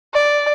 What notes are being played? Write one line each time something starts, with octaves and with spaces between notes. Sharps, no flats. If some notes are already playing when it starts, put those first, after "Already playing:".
D5